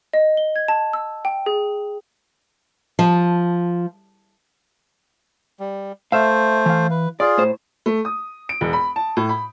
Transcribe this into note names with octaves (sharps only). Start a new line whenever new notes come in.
D#5
G7
G#6
A5
E6
G5
G#4
F3
G3
A3 C5 E5 F5
E3 F5
B4
F4 G#4 D5
A2 C5
A3
D#6
D7
E1
B5
A5
A2
B5